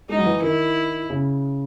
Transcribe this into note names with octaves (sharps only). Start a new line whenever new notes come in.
G#3 D#4
F#3
E3
D#3 E4
C#3